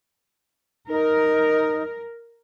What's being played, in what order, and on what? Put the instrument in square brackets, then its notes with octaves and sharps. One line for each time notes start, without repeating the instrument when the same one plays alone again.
[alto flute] D#4 [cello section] A#4